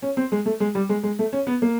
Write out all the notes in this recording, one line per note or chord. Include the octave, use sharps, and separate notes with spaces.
C#4
C4
G#3
A3
G#3
G3
G#3
G#3
A3
C#4
B3
A#3